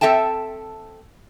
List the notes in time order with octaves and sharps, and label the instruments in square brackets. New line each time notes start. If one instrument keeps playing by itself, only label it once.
[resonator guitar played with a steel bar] C4 A4 E5 G5 A5